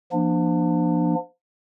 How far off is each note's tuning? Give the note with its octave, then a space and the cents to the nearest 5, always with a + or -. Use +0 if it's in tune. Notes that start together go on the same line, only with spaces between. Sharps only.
F3 -20 A#3 +35 D4 +30